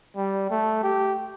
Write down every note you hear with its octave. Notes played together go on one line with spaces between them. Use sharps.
G3
A3
G4